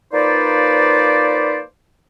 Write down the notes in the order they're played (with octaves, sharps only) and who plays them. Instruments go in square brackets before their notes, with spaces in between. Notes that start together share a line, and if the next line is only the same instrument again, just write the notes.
[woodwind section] F3 A#3 D#4 B4 C5 D5